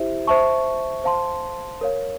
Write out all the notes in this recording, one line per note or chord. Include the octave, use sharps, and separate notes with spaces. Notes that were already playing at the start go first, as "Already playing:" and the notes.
Already playing: E4 G4 C5 E5
C5 E5 A5 C#6
C5 F5 A5 C6
A#4 C#5 F5